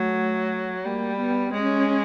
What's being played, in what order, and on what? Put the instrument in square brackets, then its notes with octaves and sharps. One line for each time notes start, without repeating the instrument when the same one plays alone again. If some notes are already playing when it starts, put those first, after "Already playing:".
Already playing: [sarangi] F#3 [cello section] A3
[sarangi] G3 [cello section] A#3
[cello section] B3
[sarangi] G#3 [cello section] C#4